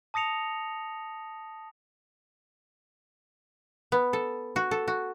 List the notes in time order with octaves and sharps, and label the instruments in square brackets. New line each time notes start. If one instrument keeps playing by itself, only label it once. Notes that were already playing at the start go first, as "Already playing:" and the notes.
[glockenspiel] A5 D#6 A#6 C#7 F7
[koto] B3
A4
F#4
A4
F#4